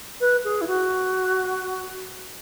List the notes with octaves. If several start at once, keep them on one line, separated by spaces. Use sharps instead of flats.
B4
G#4
E4
F#4